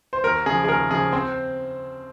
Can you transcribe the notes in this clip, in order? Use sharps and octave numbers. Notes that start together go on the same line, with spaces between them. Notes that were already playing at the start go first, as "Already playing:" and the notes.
C5
D#2 A#4
C#3 F3 G#4
G#4
D#2 A#4
C#3 F3 G#4
C4 C5